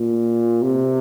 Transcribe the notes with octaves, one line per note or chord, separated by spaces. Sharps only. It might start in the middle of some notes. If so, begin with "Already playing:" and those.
Already playing: A#2
C3